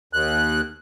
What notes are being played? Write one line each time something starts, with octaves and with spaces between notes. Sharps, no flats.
D#2 F#6